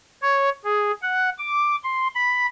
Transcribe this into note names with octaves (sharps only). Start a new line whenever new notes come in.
C#5
G#4
F#5
D6
C6
B5